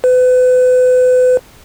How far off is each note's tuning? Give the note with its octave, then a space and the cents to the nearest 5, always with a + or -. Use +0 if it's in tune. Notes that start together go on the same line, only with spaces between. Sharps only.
B4 +35